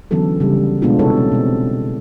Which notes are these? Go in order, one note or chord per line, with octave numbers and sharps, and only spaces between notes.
D3 E3 F#3 B3 C#4 A4
C#3 G3
B2 G#3 B3 D4 F4 F#4
C3 D#4 A4 C#5
C#4
B2 C4